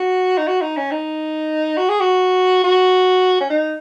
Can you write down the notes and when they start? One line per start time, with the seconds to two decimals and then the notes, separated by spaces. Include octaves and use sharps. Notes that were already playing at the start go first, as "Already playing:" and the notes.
Already playing: F#4
0.37 D#4
0.48 F#4
0.62 D#4
0.77 C#4
0.91 D#4
1.77 F#4
1.88 G#4
2.00 F#4
2.64 F#4
3.40 C#4
3.50 D#4